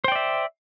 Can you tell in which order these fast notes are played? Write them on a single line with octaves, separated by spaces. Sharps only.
C5 G5 D5 E5